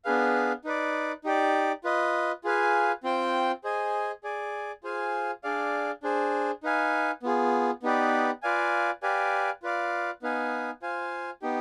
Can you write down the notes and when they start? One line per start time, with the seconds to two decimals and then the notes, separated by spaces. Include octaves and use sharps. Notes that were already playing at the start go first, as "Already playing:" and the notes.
0.05 B3 D4 G#4 B4 F5
0.65 D#4 B4 D5
1.24 D#4 G4 D5
1.84 F4 B4 D#5
2.44 F4 G#4 B4 F5 G#5
3.03 C4 F4 C5 G5
3.64 G#4 C5 D#5 G#5
4.24 G#4 D5 G#5
4.84 F4 G#4 C5 F5 G#5
5.43 D4 G#4 D5 F5
6.03 D4 G#4 C5
6.63 D#4 B4 F5 G#5
7.23 B3 F4 G#4
7.83 B3 D#4 G4 B4 D5
8.43 F4 B4 D5 F5 G#5
9.03 G4 B4 D5 F5 G#5
9.63 F4 B4 D5 F5
10.22 B3 D#4 B4 F5 G#5
10.82 F4 C5 F5 G#5
11.42 B3 D#4 G4